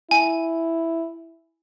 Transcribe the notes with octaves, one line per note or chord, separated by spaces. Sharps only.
E4 G#5